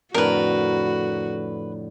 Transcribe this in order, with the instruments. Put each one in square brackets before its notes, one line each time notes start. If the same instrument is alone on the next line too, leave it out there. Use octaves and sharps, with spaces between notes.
[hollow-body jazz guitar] F2 A2 D3 [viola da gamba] F#4 [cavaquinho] A#4 B4